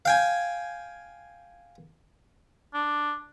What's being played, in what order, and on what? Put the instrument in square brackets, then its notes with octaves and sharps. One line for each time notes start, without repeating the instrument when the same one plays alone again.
[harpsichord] F5 G5 G#5
[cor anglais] D4